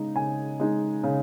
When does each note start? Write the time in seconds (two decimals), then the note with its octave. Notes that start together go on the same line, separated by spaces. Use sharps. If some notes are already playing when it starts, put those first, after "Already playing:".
Already playing: C#3 G#3 D#4
0.15 C#3 G#5
0.60 G#3 D#4
1.03 C#3